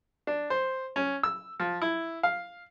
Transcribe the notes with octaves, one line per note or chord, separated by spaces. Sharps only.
D4
C5
C#4
E6
F3
E4
F5